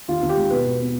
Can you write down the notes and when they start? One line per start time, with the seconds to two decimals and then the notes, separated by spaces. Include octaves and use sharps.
0.08 D#2 F4
0.22 D#2
0.29 G4
0.37 G#3
0.51 B2 B4
0.66 B2
0.81 B3